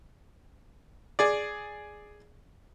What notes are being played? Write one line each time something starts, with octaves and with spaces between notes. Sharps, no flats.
G#4 D5